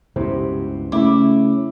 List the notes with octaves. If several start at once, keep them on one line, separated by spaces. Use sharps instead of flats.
C#2 G2 B2 E4 G4 C5
C#3 A3 C#4 E4 D6